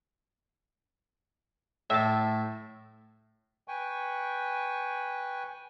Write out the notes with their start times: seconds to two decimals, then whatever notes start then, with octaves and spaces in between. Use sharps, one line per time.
1.90 A2 E5 A5
3.68 B4 G5 G#5 C#6